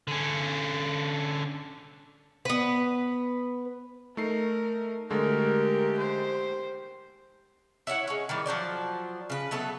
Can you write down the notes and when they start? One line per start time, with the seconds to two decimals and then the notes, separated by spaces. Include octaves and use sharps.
0.07 D3 C#4
2.45 B3 B4
4.17 A3 D#4 A#4 C7
5.11 D3 G#3 A3 G4 A#4
5.98 C5
7.87 E4 C#5 F5 F#5
8.08 G#3 C#4
8.29 D#3 E3 G3
8.46 F3 F#3 C5 D5
9.30 C#3 B4
9.51 F#3 A3 B3 A4